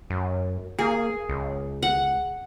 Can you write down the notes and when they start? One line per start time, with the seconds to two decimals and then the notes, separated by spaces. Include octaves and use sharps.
0.10 F#2
0.79 A#3 G#4
1.29 C#2
1.83 F#5